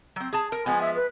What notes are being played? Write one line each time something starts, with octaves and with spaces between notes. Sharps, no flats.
F#3 C4
G#4 A5
A#4
F3 G#3 B3 G#5
E5
B4